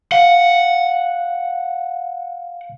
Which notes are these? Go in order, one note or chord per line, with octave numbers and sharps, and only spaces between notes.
F5 F#5